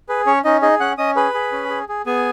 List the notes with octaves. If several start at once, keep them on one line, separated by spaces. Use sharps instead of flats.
G#4 B4
C#4 C#5
C#4 D#4 D#5
D#4 G#4 D#5
C#4 F#5 F#6
C#4 D#5 D#6
G#4 B4 B5
G#4
C#4
G#4
G#4
B3 G#4 G#5